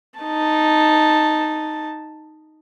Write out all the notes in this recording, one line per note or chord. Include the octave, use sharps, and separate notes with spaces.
D#4 A5